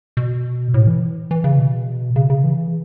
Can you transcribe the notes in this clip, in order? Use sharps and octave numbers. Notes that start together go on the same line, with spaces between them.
B2
A2
E3
E3
C#3
B2
C#3
C#3
E3